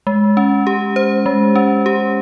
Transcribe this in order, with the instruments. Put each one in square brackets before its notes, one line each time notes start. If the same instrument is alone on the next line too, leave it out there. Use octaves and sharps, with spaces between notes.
[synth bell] G#3
C#4
G4
C5
G#3
C#4
G4